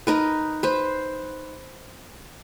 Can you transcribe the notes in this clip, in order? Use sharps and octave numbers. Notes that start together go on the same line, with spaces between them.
D#4 A#4 B4
B4 C5